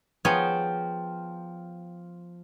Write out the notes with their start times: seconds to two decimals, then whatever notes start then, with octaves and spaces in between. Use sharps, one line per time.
0.25 F3 B3 G#4 C#5 G5